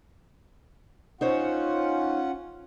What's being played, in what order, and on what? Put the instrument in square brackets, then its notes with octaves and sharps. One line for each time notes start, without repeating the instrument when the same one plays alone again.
[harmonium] C#4 F4 F#5 [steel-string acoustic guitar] D#4 C5 C#5